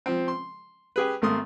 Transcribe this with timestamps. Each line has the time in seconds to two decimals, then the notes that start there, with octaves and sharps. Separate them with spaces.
0.06 F3 C4
0.28 C6
0.96 G4 G#4 B4
1.22 G#1 A3 A#3 C6 D#6